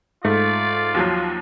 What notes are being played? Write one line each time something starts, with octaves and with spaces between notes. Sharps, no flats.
G#2 A3 F4 D5
D#2 F3 F#3